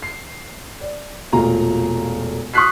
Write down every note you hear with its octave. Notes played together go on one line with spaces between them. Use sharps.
C7
D5
E1 A#2 A3 F4 A#5
C#6 D#6 F6 F#6 B6 C7